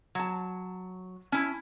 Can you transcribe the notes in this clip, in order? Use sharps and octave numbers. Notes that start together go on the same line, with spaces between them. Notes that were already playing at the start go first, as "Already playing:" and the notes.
F#3 A5
C#4 E4